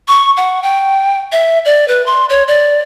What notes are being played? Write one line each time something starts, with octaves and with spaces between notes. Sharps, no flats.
C#6
F#5
G5
E5
D5
B4
C6
C#5
D5